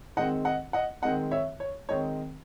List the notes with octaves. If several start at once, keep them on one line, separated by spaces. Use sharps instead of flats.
D#3 G#3 C4 D#5 F#5
D#5 F#5
D#5 F#5
D#3 G#3 C4 D#5 F#5
C#5 E5
C#5
D#3 G#3 C4 D#4 C#5